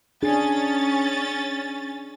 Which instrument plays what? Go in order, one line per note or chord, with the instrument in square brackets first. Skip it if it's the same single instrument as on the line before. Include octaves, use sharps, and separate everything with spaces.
[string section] C#4 A6 [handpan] D4 G#4